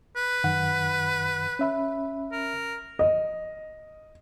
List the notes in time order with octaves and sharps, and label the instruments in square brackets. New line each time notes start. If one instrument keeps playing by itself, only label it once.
[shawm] B4
[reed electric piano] F#2 D#3 F#5
C#4 E5 B5
[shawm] A#4
[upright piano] D#5